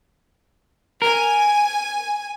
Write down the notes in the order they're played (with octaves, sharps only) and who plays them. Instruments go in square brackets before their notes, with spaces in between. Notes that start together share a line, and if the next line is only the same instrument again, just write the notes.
[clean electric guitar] A#4 [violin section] G#5